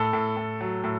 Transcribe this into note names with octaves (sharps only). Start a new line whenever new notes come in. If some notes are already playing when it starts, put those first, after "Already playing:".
Already playing: A2 A4
A2
A2
F#3
A2